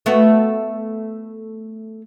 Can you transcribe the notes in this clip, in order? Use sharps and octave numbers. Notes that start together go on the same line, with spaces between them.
A3 B3 F#4